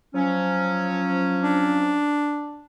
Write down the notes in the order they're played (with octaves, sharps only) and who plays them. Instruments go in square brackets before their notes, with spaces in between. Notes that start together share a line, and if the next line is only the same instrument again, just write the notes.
[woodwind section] F3 F#3 C#4
[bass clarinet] D4